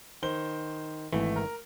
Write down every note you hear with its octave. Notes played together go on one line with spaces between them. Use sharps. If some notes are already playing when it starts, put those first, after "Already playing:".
D#3 C5 G7
G#1 E3 A3
A#4